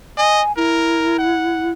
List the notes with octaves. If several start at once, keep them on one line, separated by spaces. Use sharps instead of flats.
D#5 G#5
E4 A#4
F#5